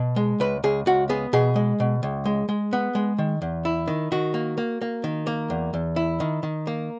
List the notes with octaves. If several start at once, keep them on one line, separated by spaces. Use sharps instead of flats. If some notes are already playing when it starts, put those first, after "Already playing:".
Already playing: B2
G#3
C#2 B4
C#2 G#4
C#2 F#4
B3 G#4
B2 G#4
G#3
B2
C#2
G#3
G#3
B3
G#3
D#3
E2
E4
D#3
D#3 F#4
A#3
A#3
A#3
D#3
A#3
E2
E2
E4
D#3
D#3
A#3